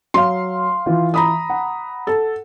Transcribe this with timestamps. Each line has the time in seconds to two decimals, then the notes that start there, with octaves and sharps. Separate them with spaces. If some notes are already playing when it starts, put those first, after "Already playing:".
0.14 F#3 F5 C6
0.86 E3 F4
1.14 A#5 B5 D#6
1.50 F#5
2.07 A4